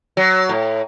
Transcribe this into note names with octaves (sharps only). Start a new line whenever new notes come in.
F#3
A2